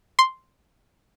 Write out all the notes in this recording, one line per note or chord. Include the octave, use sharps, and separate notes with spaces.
C6